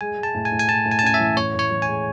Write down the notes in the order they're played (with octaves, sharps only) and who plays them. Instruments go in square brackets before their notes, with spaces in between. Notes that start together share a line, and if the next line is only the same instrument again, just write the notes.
[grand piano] G#3 [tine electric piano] G#5
[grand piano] G#3
[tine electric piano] A5
[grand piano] A2
[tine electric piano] G#5
[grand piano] A2
[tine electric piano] G#5
[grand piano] A2 [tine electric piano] A5
[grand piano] A2
[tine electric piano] G#5
A5
[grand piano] C#4 [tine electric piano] G#5
[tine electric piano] E5
[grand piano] E3
[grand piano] A2 [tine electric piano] C#5
[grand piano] A2 [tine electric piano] C#5
[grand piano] E3
[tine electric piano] G#5
[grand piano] G#3